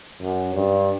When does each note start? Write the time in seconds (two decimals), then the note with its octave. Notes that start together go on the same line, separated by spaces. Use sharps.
0.22 F#2
0.55 G2